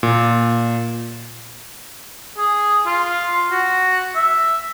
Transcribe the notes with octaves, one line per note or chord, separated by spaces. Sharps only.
A#2
G#4
F4
F#4
E5